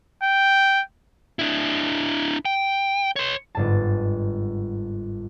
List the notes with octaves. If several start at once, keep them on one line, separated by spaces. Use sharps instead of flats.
G5
D4 E4
G5
C#5 C6
G1 G#2 A5